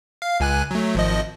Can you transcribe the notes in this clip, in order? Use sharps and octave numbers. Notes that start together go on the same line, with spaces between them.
F5
C#2 G#5 F#6
F#3 A3
G#1 F3 D#5